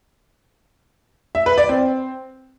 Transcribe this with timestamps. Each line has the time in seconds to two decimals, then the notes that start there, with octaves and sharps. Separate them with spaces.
1.35 E5
1.46 B4
1.58 D5
1.69 C4